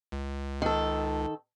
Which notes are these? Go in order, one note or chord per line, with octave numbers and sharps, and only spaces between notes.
C#2
D#3 A4